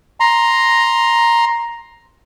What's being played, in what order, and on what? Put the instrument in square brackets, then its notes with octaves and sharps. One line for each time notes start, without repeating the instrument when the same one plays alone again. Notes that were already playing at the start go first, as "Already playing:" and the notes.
[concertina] A#5 C6